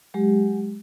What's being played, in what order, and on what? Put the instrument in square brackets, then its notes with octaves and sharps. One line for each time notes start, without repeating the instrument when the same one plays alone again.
[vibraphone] F#3 G#3 G4